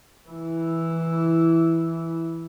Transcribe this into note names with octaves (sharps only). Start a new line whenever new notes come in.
E3 E4